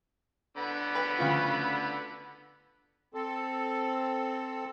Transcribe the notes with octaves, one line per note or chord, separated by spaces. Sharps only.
D3 B3 B5
B4
D2 C#3 F3
C4 A4